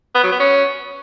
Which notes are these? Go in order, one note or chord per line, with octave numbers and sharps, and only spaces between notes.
B3
F#3
B3
C#4